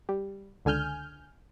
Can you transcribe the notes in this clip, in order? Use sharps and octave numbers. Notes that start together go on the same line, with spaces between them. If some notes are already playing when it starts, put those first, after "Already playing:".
G3
C#2 D3 G#5 F6 G6